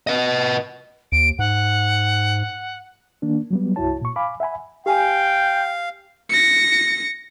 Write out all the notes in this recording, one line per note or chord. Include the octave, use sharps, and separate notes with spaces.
B4 D#5
D#2 D7
G#2 F#5
D#3 A#3 D4
F#3 G3 B3
C2 G2 E4 F#4 C#5 A5
A#2 C#6
F5 G#5 B5 D6
E5 F#5 G#5 B5
G4 F5 G5 G#5
A#6 C#7